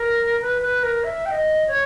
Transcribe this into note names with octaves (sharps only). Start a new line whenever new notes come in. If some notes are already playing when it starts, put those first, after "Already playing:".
Already playing: A#4
B4
B4
A#4
E5
G5
D#5
C#5